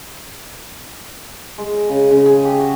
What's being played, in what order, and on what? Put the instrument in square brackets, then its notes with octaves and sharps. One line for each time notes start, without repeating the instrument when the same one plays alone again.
[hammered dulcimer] G#3
D#5
C#3
C#3
G#4
G4
F#4